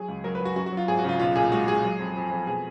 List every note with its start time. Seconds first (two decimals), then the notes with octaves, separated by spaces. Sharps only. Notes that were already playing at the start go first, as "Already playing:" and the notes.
Already playing: F#3 G#4
0.08 C#2
0.24 F#3 A#4
0.35 B4
0.40 F#3
0.45 F#4
0.56 F#2 F#4
0.66 F#4
0.72 F#3 F4
0.88 G#1 G#4
0.99 F#4
1.04 C#3 F4
1.19 B1 F4
1.36 A#2 G#4
1.52 G#3 F#4
1.68 G#3 G#4
1.84 F#3
1.99 F2
2.16 F2
2.31 F2
2.47 B2 G#4